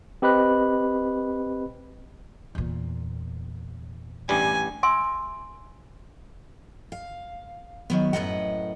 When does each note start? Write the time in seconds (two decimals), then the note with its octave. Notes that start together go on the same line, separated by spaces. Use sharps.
0.22 C4 G4 B4 D#5 B5 F#6
2.55 E2 A#2
4.29 A1 G2 G3 G#5
4.83 E5 G#5 C6 E6
6.92 F5
7.90 D#3 F#3 B3
8.13 F#2 A2 D#3 B4 D#5 F#5